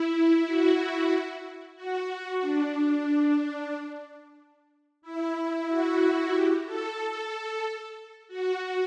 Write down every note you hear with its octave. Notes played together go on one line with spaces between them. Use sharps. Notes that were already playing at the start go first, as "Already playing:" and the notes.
Already playing: E4
F#4
F#4
F#4
D4
E4
F#4
G4
A4
F#4